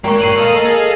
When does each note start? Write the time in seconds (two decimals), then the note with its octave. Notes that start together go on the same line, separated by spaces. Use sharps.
0.04 G#3 A#3 A#4 G5 C#6
0.20 G1 A#2 C7 D#7 F#7
0.36 A4 D#5 F5
0.65 G#4